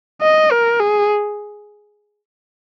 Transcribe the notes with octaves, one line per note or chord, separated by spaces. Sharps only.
D#5
A#4
G#4